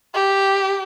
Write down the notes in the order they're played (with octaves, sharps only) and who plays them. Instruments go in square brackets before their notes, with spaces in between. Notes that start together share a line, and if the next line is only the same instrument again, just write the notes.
[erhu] G4